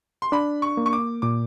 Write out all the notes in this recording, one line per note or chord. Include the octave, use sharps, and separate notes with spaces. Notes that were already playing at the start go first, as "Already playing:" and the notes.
C6
D4 B5
C#6
A#3
C#6
D6
A#2 D6